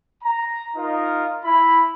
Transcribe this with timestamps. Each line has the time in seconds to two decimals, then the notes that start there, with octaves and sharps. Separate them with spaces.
0.23 A#5
0.76 D#4 F4 A#4 D#5 F5
1.44 E4 B5